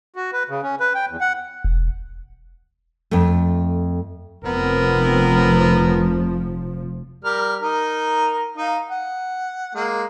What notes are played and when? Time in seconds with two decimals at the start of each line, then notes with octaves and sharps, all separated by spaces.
0.16 F#4
0.33 B4
0.49 C#3
0.63 C#4
0.80 B4
0.95 G5
1.09 E2
1.21 F#5
1.64 E1
3.11 F2 A3
4.45 F1 F3 B3 C4 A#4
7.25 G3 A#4 F6
7.62 D#4 A#4
8.57 D#4 F5
8.90 F#5
9.75 G#3 A#3